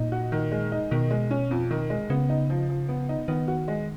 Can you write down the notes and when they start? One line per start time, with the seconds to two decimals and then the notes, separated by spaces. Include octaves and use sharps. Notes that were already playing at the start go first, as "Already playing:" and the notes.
Already playing: A#2 D#4
0.12 F#4
0.32 D#3
0.52 G#3
0.72 D#4
0.91 B2 D#3
1.10 G#3
1.31 C#4
1.51 F2
1.71 D#3
1.90 G#3
2.10 C#3 B3
2.29 D#4
2.50 F3
2.69 F3
2.89 B3
3.09 D#4
3.28 D#3 B3
3.48 F#4
3.68 G#3